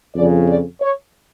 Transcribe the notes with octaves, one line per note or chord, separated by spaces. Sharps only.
F2 C#3 F3 D5
D5
C#5